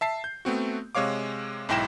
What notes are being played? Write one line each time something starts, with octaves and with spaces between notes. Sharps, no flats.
E5 A5 C7
G6
A3 B3 C4 F#4
C3 G#3 C#5 F5 D6
B1 G#2 E4 G5 A#6 E7